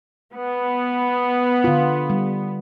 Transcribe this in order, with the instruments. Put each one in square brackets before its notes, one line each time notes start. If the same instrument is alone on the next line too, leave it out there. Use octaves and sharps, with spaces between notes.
[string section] B3
[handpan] D3 F4
G3